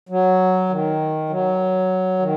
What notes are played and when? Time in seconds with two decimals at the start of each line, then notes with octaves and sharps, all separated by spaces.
0.09 F#3
0.69 D#3
1.29 F#3
2.19 D#3